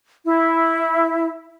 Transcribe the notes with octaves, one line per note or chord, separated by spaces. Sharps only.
E4